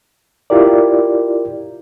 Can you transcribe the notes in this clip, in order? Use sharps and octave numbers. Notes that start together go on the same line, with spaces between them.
E4 F4 G4 A#4 D5